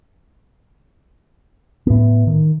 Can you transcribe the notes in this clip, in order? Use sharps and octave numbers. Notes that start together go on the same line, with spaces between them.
A2 B3
D#3